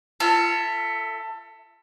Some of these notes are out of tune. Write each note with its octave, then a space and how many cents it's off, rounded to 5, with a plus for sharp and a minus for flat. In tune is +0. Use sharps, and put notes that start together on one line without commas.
F4 -30 A4 +20 E5 +0